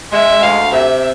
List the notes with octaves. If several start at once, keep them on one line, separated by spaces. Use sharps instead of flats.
G#3 E5
D2 F5
C3 E5